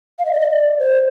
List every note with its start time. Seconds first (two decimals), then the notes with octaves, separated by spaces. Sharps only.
0.19 F5
0.25 D#5
0.33 D5
0.40 D#5
0.50 D5
0.79 C5